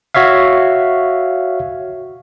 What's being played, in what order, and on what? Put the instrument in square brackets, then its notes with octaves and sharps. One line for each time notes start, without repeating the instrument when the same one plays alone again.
[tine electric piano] F#4 C#5 E5 F5